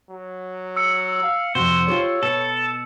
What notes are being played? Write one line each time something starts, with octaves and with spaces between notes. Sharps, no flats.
F#3
E6 C#7
F5
F2 C3 F#4 C5
F4 G4 A4 C#5
B2 A4